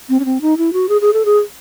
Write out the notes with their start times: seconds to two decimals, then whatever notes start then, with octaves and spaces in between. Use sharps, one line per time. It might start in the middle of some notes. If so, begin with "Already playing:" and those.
0.09 C4
0.20 C#4
0.25 C4
0.41 D#4
0.58 E4
0.73 F#4
0.89 G#4
1.01 G#4
1.13 A4
1.25 G#4